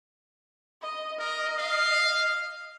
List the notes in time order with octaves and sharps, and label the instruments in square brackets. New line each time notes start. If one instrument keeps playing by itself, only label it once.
[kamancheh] D#5
[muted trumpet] A#4 [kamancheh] D#5
[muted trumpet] F5